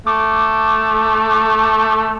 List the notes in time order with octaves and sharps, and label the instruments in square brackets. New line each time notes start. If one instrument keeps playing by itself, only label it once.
[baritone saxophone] A3 [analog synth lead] D6